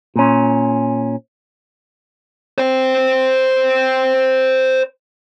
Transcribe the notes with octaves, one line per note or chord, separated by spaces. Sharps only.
A#2 C#4
C5 G5